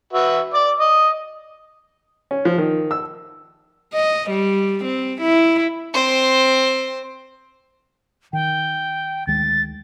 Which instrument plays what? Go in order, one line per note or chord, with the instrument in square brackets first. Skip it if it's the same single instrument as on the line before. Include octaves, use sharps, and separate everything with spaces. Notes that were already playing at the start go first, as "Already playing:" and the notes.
[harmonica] F#4 B4 E5
D5 D6
D#5
[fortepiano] C#4
F3
D#3
E6
[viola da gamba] D#5
G3
C4
E4
[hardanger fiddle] C4 C5
[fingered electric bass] D#3 [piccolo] G5
[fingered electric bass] D2 D#3 G#3 [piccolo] A6